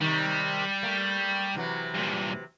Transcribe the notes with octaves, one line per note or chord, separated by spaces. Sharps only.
C3 D#3 G3
A3 A#3
C3 E3 F#3
G2 A#2